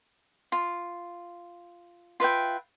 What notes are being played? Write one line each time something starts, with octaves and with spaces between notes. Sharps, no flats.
F4
F4 B4 E5 G5